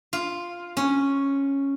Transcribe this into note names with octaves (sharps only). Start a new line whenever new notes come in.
F4
C#4